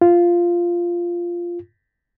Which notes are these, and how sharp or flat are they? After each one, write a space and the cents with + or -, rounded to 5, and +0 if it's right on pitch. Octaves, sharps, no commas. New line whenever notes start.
F4 -10